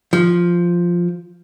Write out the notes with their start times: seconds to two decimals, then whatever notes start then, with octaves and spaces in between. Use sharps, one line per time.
0.13 F3